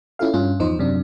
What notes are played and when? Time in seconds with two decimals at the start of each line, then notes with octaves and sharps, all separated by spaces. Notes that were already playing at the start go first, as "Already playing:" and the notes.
0.19 C#4 E4 F4 A4 F5
0.33 G2 C#4 F4
0.60 E2 F3 D#4 C5
0.79 F#2 C3 D4